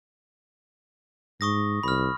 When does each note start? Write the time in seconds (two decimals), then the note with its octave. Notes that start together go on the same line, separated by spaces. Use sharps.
1.41 G#2 C#6 D#6 A#6
1.83 C2 B5 F6